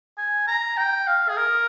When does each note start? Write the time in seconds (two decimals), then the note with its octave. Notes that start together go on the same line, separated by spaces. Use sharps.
0.18 G#5
0.47 A#5
0.77 G5
1.07 F5
1.29 G#4
1.37 A#4